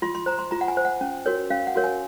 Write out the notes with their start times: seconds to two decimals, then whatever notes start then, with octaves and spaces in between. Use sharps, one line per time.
0.02 F4 C6
0.15 C6
0.26 C5 A#5
0.39 C6
0.51 F4 A#5
0.61 F#5
0.68 G#5
0.77 C5
0.85 F#5
1.01 C#4
1.26 F#4 A#4 C#5
1.50 C#4 F5
1.67 F#5
1.75 F#4 A#4 C#5
1.84 G#5